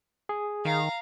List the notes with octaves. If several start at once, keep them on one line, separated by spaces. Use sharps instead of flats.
G#4
D#3 F5 A#5